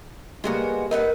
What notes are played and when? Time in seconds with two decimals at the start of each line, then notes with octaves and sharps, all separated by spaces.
0.44 G3 G#3 A#3 B3 F#4
0.91 D#4 A#4 B4 F#5